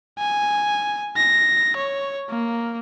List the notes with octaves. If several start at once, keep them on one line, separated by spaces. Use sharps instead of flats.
G#5
A#6
C#5
A#3